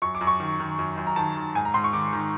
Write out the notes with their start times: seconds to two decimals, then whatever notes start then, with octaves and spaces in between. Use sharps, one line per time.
0.02 F#2 C#6
0.15 D6
0.21 F#2
0.27 C#6
0.40 D#3
0.60 D#3
0.79 F#2
0.98 F#2
1.07 A#5
1.16 D#3 A5
1.36 D#3
1.55 G#2 G#5
1.65 A#5
1.74 G#2 C6
1.84 C#6
1.93 D#3 D6
2.13 D#3